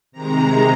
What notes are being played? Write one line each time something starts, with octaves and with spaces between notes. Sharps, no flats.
C3 D#3 G#3 A#5